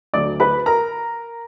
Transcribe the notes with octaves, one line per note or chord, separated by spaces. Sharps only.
D2 D3 F#3 D5 D6
B4 B5
A#4 A#5